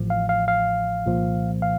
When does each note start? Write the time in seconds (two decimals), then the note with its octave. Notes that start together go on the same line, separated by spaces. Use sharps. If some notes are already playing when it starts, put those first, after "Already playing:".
Already playing: A1 A2 F3
0.10 F5
0.29 F5
0.48 F5
1.05 C2 A#2 F3
1.62 F5